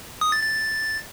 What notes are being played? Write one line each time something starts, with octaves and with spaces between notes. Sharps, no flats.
D#6
A6
A6